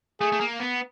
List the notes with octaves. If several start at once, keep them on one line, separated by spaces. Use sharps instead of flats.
A3 G#4
A3
A#3
B3